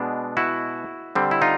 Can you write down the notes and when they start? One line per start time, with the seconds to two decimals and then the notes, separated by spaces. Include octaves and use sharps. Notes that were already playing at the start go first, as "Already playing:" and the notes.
Already playing: B2 G#3 B3 D4
0.37 E4 F#4
1.15 D3 G3 C4
1.31 E4
1.42 D#4 F4